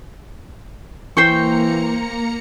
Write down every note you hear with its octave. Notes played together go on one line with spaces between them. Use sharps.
E3 A#3 C5 G5 A#5 C#6 C#7